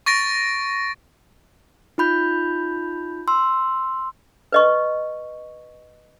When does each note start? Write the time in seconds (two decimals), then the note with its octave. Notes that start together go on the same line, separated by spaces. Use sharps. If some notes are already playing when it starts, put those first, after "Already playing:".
0.06 C#6 A6 A#6 D7
1.98 D#4 F4 B5 G6
3.28 C6 E6
4.52 B4 D#5 C#6